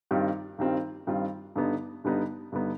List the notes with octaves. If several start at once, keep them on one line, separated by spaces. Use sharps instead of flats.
G2 D#3 G3 C4 F4
G2 D#3 G3 C4 F4
G2 D#3 G3 C4 F4
G2 D3 G3 B3 D#4
G2 D3 G3 B3 D#4
G2 D3 G3 B3 D#4